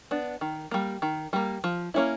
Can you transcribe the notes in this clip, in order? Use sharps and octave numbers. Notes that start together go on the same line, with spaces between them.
B3 D4
D#3
G3 A#3
D#3
G3 A#3
F3
A#3 C#4 E4